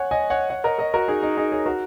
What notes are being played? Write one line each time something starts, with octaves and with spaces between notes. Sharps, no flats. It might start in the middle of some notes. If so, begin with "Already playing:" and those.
Already playing: C#5 F#5 G#5
D#5 G#5
C#5 F#5
C#5 F#5
A#4 D#5
A#4 D#5
F#4 A#4
D#4 G#4
D#4
D#4 G#4
G#4 C#5
F#4 A#4